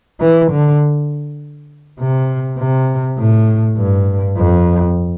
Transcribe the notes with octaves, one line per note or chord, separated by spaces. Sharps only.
E3
D3
C3
C3
A2
G2
F2